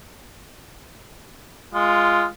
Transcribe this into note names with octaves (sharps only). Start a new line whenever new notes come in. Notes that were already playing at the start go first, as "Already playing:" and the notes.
G#3 F4